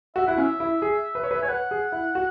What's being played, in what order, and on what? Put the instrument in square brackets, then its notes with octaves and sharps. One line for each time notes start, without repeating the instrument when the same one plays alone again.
[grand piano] F#4 [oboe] E5
[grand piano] E4 [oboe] F#5
[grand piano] C#4
[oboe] E5
[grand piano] E4
G#4
B4
C#5
B4
[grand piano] C#5 [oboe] G#5
[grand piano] B4 [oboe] F#5
[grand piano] G#4
E4
F#4